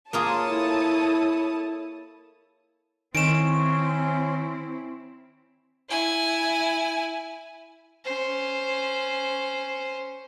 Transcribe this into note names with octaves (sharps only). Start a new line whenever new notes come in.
A#3 F4 G#4 C#5 A5 D#6
E4 A4
D#3 C4 C#4 E4 D7 E7
E4 G#5
C#4 C5